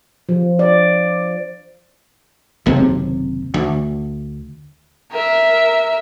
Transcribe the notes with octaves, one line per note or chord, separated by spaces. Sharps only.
F3
D5
F#1 D#2 C3 C4
D2
A#4 E5